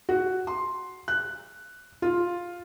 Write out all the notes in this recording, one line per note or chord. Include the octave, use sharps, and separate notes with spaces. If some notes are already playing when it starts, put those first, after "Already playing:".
F#4
C6
F#6
F4